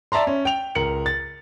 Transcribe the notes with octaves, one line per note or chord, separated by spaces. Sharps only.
D5 E5 A5 A#5 C6
C#4
G5 F7
C#2 A#4 C#7 F#7
A6